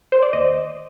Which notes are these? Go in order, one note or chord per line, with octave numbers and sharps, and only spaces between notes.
C5
D5
D#2 D#5